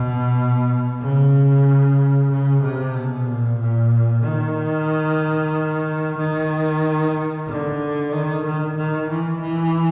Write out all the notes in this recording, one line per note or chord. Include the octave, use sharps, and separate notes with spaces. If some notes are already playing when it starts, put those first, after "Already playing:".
Already playing: B2
C#3
C#3
C3
B2
A#2
A#2
D#3
D#3
D3
D#3
D#3
D#3
E3
E3